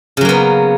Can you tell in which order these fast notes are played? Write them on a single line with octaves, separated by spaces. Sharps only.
C#3 F#3 A#3 B3